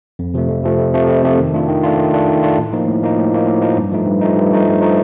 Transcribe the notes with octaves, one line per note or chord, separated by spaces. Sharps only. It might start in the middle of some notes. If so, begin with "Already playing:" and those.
F2
C3 F3 A3
F2
C3 F3 A3
F2
C3 F3 A3
F2
C3 F3 A3
D#3
A3 D4 F4
D#3
A3 D4 F4
D#3
A3 D4 F4
D#3
A3 D4 F4
A2
F3 A#3 D#4
A2
F3 A#3 D#4
A2
F3 A#3 D#4
A2
F3 A#3 D#4
G2
F3 A3 D#4
G2
F3 A3 D#4
G2
F3 A3 D#4
G2
F3 A3 D#4